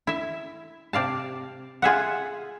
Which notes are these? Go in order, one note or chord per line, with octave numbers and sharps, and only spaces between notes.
E4 E5
C3 D5 F5 A5
F4 G#4 E5 F#5